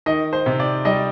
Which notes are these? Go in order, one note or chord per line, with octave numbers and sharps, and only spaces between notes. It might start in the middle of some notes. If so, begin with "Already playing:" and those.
D#3 D#5
C5
C3
D5
G3 D#5